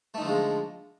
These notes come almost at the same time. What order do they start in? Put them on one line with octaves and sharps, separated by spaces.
A3 D#4 D3 F3 G#3